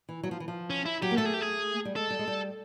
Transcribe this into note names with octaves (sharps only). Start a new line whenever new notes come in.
E3
F#3
F3
E3
F3
C#4
E4
F#3 G4
A#3
A3 A4
G#4
G4
G#4
G3
G#3 A4
G3
G#3
G3